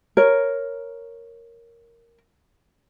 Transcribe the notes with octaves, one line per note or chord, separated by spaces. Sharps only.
A#4 C#5